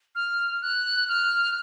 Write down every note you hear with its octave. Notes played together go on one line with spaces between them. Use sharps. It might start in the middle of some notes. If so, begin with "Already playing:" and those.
F6
F#6
F6